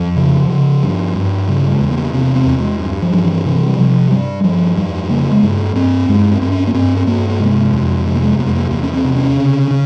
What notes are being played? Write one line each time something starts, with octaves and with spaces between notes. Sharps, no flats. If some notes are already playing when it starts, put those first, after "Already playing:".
Already playing: F2 F3
C#3
C#3
G2
G2
C#3 G3
G#3
E2
A#3
C3 C4
C4
E2
G#3
G2
F3
G2
E3
C3 E3
G3
C3 F3
G2 G3
G2 F3
F2 G3
C#3 A#3
G#3
G2 A#3
G2 C4
G2 G#3
C4
G2 C4
C#4
A#3
G2 C4
C4
G2 A#3
A#3
C3 G#3
F2
C3 G#3
A#3
G#3
F2 A#3
G#3
A#3
E2 A#3
C#4
C4
C3
C#4
C#3
C#3